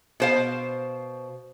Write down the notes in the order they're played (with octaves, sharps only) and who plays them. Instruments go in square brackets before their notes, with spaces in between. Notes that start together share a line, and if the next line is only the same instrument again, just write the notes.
[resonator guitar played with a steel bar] B2 C5 F5